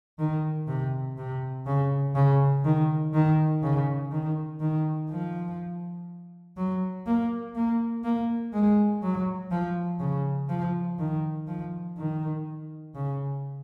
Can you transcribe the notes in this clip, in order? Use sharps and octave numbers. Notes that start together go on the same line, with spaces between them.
D#3
C3
C3
C#3
C#3
D#3
D#3
C#3
D#3
D#3
F3
F#3
A#3
A#3
A#3
G#3
F#3
F3
C#3
F3
D#3
F3
D#3
C#3